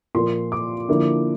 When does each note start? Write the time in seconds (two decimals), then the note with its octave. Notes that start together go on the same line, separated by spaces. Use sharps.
0.15 A#2 F3 A#3 C6
0.52 D6
0.89 D3 F3 A#3 E4